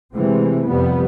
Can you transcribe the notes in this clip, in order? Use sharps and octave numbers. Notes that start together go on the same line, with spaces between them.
C3 E3 G#3 A3 C4
F2 C3 G3 B3